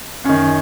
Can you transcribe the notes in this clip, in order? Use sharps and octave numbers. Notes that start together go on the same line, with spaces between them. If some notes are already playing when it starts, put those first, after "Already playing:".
F#2 D#3 C#4